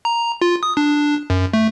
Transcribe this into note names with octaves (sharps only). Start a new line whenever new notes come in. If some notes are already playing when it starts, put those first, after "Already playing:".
A#5
F4
D#6
D4
F#2
A3